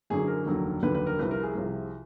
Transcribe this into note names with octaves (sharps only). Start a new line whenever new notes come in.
F#1 F#2 D3 F#3 G#4
A#4
F1 D#2 D3 F#3
F1 D#2 D3 F#3 B4
B4
A#4
C2 C3 F3 B4
A#4
G#4
C2 C3 F3